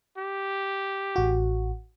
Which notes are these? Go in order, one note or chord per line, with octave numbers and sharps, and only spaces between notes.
G4
A1 F#4